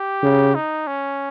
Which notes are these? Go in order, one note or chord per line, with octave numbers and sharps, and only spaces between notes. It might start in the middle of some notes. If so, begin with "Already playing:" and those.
Already playing: G4
C#3
D#4
C#4